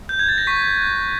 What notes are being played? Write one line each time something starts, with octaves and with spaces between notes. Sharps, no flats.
G6
G#6
A6
A#6
C#6 B6
F#6